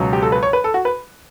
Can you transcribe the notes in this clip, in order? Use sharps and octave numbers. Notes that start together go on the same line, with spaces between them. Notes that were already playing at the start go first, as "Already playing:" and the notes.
Already playing: C#2 B2 F#3
G4
A4
B4
C#5
B4
A4
F#4
B4